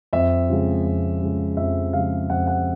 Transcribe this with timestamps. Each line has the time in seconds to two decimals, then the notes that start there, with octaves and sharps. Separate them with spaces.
0.13 F2 E5
0.49 C#3 F3 G#3
0.85 F2
1.21 C#3 F3 G#3
1.57 F2 E5
1.93 C#3 F3 G#3 F5
2.30 F2 F#5
2.47 F#5